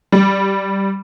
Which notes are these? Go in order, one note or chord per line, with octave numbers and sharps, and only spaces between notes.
G3